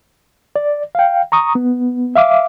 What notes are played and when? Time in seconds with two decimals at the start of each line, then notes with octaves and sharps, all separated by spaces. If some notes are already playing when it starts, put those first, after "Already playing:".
0.56 D5
0.95 F5 G5
1.32 A#5 C#6 D#6
1.55 B3
2.16 E5 F5 D6